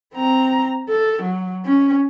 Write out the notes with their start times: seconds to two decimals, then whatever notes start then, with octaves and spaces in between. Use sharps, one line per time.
0.15 C4 A#5
0.89 A4
1.23 F#3
1.66 C#4